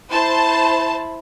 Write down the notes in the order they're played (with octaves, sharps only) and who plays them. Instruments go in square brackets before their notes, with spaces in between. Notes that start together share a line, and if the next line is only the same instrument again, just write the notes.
[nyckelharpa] E4 [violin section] C5 A5